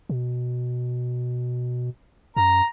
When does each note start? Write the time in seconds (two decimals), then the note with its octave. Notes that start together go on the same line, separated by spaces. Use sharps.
0.09 B2
2.37 F#2 A#5